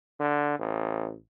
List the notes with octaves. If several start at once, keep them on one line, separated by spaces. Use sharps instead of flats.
D3
A1